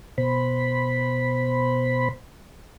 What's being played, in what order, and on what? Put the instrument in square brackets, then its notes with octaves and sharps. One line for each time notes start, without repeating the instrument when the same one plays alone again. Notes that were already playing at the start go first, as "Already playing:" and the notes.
[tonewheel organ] B2 C5 B5